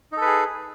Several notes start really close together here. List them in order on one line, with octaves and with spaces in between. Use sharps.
D#4 A4 B4 G#4